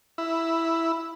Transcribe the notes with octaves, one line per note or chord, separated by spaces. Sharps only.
E4